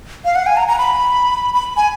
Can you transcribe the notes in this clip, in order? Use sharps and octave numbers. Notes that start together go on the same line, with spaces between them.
F5
F#5
G#5
A#5
A#5
B5
B5
G#5